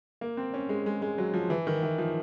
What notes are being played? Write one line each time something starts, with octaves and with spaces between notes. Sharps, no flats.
A#3
C4
C#4
G#3
G#3
G#3
F#3
F3
E3
D#3
E3
F3